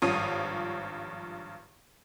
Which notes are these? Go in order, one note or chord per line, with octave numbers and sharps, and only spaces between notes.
G#1 G2 F3 C#5 D#6 D#7